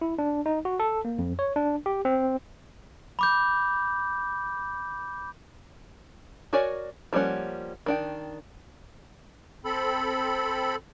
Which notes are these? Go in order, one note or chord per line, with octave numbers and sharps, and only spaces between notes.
E4
D4
D#4
F#4
A4
A#3
F2
C#5
D4
G4
C4
B5 D6 G6
F#4 A#4 C#5 D5 G#5
F3 G3 A#3 C#4 F#5
D#3 D4 G5
C4 A4 B5